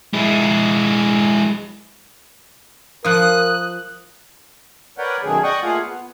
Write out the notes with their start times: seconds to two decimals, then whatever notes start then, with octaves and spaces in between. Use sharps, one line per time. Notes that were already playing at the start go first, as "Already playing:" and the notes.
0.13 G#3 E4
3.05 F3 F4 A#4 D#6 F#6
4.98 A#4 B4 C#5 D5 F#5 G5
5.23 F#2 B2 D#3 A3 G#4
5.43 D5 D#5 F#5 G5 C#6 D#6
5.63 A3 A#3 F4 G#4 F5 F#5
5.82 B3